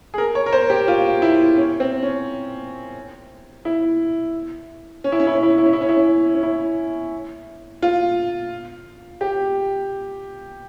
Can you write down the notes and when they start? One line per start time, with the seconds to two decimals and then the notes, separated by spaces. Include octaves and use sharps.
0.14 G#4
0.18 A#4
0.35 C#5
0.46 A#4
0.53 C5
0.70 G4
0.88 F4
1.22 E4
1.57 C#4
1.80 C4
2.03 C#4
3.65 E4
5.04 C#4
5.12 E4
5.20 C#4
5.27 E4
5.35 C#4
5.43 E4
5.50 C#4
5.58 E4
5.66 C#4
5.73 E4
5.81 C#4
5.89 E4
5.96 C#4
6.35 C#4
6.43 E4
7.82 F4
9.21 G4